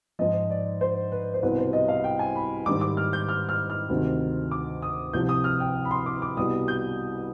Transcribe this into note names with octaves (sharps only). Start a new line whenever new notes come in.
G#2 F3 D#5
D5
C5
B4
C5
C2 B2 G3 B4
C5
D#5
F5
G5
G#5
B5
G#2 D#3 G3 D6
D6
F6
G6
F6
F6
F6
D2 C3 D#3
D6
D#6
C2 C3 F3 G6
D#6
F6
G5
B5
C6
D6
D6
C2 B2 G3 D#6
G6